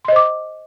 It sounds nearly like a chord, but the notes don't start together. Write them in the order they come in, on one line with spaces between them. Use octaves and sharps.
C6 D#5 C5 D6